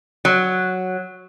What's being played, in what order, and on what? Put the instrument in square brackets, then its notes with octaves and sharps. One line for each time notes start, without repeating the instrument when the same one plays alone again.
[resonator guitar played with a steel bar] F#3